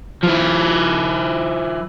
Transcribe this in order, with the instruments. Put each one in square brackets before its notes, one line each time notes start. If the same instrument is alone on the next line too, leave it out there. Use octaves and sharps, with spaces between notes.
[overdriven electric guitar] F3 E4